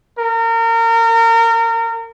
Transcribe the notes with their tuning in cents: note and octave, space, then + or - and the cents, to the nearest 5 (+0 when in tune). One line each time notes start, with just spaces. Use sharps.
A#4 -30